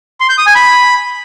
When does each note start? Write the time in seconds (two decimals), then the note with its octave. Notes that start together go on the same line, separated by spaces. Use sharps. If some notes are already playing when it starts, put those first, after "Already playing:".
0.20 C6
0.29 G6
0.38 D#6
0.47 G#5
0.55 B5